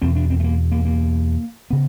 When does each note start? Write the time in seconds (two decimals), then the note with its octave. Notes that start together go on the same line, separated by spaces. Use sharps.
0.01 E2 B2 C4
0.16 D4
0.30 C4
0.40 A3
0.44 A#3
0.72 A#3
0.85 A#3
1.70 C#3 B3